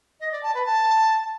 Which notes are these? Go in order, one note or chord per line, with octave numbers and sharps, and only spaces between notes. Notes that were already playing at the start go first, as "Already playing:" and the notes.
D#5
D5
A5
B4
A5